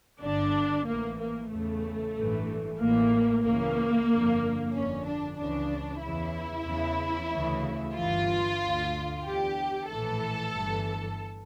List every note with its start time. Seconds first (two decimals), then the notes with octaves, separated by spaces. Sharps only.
0.21 G1 G2 D3 D4
0.85 A1 A2 E3 A#3
1.19 A#3
1.50 E2 C#3 E3 A3
2.15 A1 G2 E3
2.79 A1 A2 E3 A#3
3.44 C#2 C#3 E3 A#3
4.08 G1 F2 D3
4.73 G1 F2 D3 C#4
5.05 D4
5.37 C#2 C#3 E3 D4
6.02 E2 C#3 E3 E4
6.66 E2 C#3 E3
7.31 D2 C#3 E3
7.95 G1 G2 E3 F4
8.60 D2 D3
9.24 E2 D3 G4
9.89 A#1 A2 E3 A4
10.53 G1 G2 E3